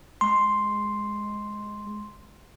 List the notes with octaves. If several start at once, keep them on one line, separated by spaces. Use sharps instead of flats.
G#3 C6